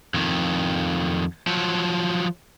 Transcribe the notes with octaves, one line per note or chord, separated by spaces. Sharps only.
F2 D#3
F3 F#3